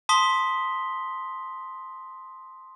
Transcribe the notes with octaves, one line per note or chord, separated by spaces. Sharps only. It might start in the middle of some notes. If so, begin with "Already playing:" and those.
A5 C6 D#6 B6 G7